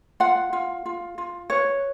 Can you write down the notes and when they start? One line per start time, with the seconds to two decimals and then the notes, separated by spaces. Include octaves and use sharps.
0.20 F4 F#5
0.53 F4
0.86 F4
1.18 F4
1.50 B4 C#5